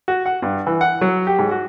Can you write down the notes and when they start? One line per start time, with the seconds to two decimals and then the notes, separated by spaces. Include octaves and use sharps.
0.08 F#4
0.26 F#5
0.42 G2
0.67 E3
0.81 F#5
1.01 F#3
1.27 G4
1.39 G#2
1.51 F#4